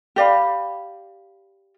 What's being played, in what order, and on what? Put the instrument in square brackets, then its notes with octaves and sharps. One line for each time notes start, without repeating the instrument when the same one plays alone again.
[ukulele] G4 D5 F5 B5